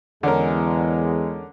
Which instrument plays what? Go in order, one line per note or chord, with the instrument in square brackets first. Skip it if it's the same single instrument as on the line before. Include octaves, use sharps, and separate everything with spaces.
[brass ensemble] E2 G#3 [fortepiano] D3 C#4 A#4